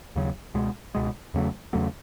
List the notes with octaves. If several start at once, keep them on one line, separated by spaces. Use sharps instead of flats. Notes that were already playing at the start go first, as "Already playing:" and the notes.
D#2 C#3 F#3
C#2 B2 G#3
C#2 B2 G#3
E2 C#3 F#3 A3
E2 C#3 F#3 A3